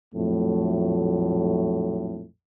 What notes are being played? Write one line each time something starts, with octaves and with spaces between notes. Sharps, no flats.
A#1 F2 A2 F#3 A3